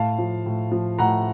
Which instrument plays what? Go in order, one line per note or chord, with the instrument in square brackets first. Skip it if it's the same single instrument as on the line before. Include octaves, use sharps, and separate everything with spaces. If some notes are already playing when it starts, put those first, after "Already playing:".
Already playing: [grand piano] A2 F5 A5
F3
A2
F3
A2 F#5 A#5